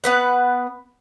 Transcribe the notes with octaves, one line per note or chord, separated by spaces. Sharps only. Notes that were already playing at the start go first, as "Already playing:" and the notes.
B3 B4 F#5